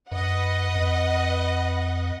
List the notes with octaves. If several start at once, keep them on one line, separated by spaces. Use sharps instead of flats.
F#2 B4 D#5 F#5
F2